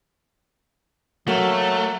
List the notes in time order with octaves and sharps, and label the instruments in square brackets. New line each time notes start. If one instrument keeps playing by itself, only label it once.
[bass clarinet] F#3 [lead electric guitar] A3 [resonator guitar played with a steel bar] A#3 F#4